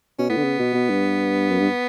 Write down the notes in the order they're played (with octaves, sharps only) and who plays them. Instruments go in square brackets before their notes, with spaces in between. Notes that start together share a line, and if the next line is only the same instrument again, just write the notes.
[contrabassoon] B2 [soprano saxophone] C#4
[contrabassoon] A2 [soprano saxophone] B3
[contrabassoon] D3
C#3
B2
B2
G2
F#2
G2